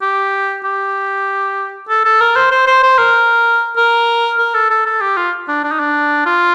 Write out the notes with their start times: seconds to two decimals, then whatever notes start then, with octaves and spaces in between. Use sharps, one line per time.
0.02 G4
0.64 G4
1.89 A4
2.05 A4
2.21 A#4
2.36 C5
2.51 C5
2.67 C5
2.83 C5
2.98 A#4
3.77 A#4
4.39 A#4
4.54 A4
4.70 A4
4.86 A4
5.01 G4
5.17 F4
5.48 D4
5.64 D4
5.72 D#4
5.79 D4
6.26 F4